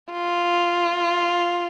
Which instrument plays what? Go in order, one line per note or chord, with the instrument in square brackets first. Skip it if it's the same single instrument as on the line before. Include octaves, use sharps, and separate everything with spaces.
[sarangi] F4